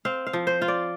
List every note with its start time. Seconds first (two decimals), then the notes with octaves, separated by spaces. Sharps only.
0.05 C4 F5
0.27 F5
0.33 F3
0.47 C5
0.62 F4
0.68 D5